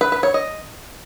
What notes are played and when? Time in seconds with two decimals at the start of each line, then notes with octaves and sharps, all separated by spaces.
0.01 B4
0.12 B4
0.23 C#5
0.34 D#5